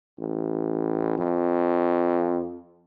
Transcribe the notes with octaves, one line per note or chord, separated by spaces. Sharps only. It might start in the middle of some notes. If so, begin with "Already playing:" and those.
A1
F2